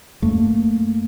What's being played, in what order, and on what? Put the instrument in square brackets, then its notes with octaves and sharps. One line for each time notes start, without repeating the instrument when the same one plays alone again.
[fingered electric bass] F#2 A3 A#3